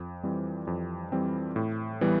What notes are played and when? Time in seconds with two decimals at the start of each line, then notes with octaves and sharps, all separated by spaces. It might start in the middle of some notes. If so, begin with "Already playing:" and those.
Already playing: F2
0.23 E3 G3 C4
0.67 F2
1.12 E3 G3 C4
1.56 A2
2.01 E3 G3 B3